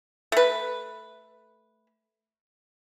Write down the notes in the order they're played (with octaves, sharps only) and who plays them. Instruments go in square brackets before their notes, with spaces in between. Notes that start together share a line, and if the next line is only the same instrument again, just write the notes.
[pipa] A3 B4